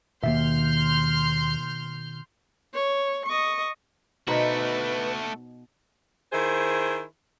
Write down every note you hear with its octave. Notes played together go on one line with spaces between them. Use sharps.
D#2 B2 D#3 A#3 E5 C6 F6 G6
C#5
D#5 C#6
B2 A3 D#4 F#4 B4 C5
D#3 E4 G#4 C5